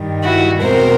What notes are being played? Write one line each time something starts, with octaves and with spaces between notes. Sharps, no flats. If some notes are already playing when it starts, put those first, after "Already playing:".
Already playing: G2 D#3 G3
E4 F#4
E2 B2 G#3 C4 A#4 C5